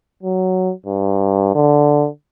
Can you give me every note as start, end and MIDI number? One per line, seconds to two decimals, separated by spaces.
0.23 0.72 54
0.86 1.51 43
1.55 2.07 50